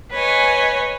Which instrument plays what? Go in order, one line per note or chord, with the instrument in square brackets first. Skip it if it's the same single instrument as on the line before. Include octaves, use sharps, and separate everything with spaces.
[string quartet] B4 C#5 D#5 G#5